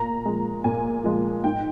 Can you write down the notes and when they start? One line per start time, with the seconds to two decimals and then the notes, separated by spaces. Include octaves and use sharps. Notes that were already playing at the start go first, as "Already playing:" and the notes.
Already playing: A#2 A#5
0.25 F3 G#3
0.64 A#2 G#5
1.04 F3 G#3
1.44 G#2 G5